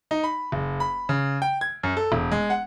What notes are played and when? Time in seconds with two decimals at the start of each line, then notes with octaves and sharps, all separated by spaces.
0.11 D#4
0.24 B5
0.52 F#1
0.80 B5
1.09 C#3
1.42 G5
1.61 G#6
1.83 F#2
1.97 A4
2.12 E1
2.31 G#3
2.50 F#5